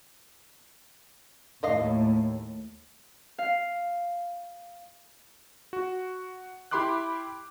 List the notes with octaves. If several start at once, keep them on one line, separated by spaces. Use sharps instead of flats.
D#2 A2 D5 D#5 F5
F5
F#4
E4 G4 B5 C6 D6 F#6